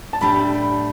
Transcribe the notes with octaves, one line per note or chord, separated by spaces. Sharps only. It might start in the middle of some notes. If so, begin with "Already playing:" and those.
A5
A2 G3 D4 B5